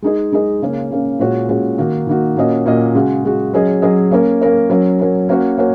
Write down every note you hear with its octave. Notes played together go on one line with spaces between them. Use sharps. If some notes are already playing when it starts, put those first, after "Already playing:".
G#3 D#4 G#4 D#5
G#3 D#4 G#4 D#5
C#3 A#3 C#4
C#3 A#3 C#4
A#2 G#3 C#4 F#4 C#5
A#2 G#3 C#4 F#4 C#5
D#3 A#3 D#4 F#4
D#3 A#3 D#4 F#4
A#2 A#3 C#4 F#4 D#5
A#2 A#3 C#4 F#4 D#5
C#3 G#3 F#4
C#3 G#3 F#4
F#3 C#4 G#4 D#5
F#3 C#4 G#4 D#5
A#3 C#4 A#4 C#5
A#3 C#4 A#4 C#5
F#3 C#4 A#4
F#3 C#4 A#4
A#3 C#4 F#4 C#5
A#3 C#4 F#4 C#5